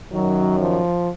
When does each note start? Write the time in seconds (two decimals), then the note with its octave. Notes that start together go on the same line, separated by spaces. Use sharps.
0.12 F#2 D#3 F#3
0.59 F3